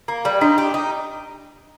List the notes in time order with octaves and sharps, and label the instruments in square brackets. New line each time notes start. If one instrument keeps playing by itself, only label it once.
[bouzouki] A#3
G3
[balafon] D4 [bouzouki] D#4
[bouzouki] G4
D#4